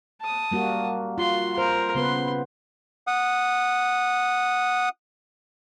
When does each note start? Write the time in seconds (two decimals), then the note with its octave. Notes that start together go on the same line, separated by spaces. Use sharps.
0.21 A5 D#6
0.51 G3 A#3 F#4
1.18 F4 F#4 C6
1.58 A#4 C5
1.95 C#3 B3 B4 C6
3.07 F#5 D#6